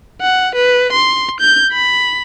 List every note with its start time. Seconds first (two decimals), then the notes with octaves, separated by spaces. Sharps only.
0.22 F#5
0.55 B4
0.93 C6
1.40 G6
1.72 B5